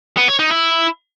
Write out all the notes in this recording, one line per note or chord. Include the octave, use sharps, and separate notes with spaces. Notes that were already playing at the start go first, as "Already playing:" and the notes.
B3
C#5
D#4
E4